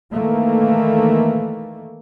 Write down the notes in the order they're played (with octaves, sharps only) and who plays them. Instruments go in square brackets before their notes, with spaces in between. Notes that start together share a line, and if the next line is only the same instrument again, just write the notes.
[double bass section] D#3 E3 A3 A#3